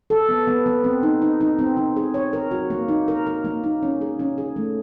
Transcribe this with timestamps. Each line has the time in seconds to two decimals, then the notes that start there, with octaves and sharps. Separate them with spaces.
0.10 A4
0.29 B3
0.47 B3
0.66 B3
0.84 C4
1.03 D#4
1.22 D#4
1.41 D#4
1.59 C4
1.77 D#4
1.96 G#4
2.14 C#5
2.33 A#4
2.51 F#4
2.70 A#3
2.88 D#4
3.08 A#4
3.26 A#4
3.45 A#3
3.64 D#4
3.83 C#4
4.01 G#4
4.19 C#4
4.38 G#4
4.56 A3